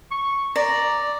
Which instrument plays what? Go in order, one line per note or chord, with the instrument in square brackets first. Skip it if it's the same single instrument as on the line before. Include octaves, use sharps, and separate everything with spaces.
[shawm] C#6
[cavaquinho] D5 [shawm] A#5